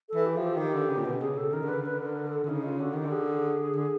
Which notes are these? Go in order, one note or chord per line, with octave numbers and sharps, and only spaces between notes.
A4
E3
G4
F3
G4
D#3 G4
D3
C#3
A#2
B2
C#3 G#4
A4
D#3 A#4
D3
B4
C#3
D3 B4
B4
A#4
A#4
A4
D3
C#3 D#4
F4
D3 F#4
D#3 G4
D3
G#4
D3